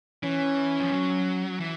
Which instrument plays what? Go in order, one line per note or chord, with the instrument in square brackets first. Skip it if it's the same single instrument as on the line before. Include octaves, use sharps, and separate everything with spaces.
[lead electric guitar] E3 [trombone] C#4
[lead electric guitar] F3
F#3
E3